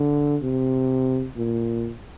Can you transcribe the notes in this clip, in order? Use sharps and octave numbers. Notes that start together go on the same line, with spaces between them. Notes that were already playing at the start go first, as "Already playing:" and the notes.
Already playing: D3
C3
A#2